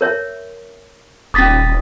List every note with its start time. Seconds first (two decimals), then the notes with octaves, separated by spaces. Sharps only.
0.01 A#4 C#5 E5
1.34 D#1 C#4 D6 D#6 A6 B6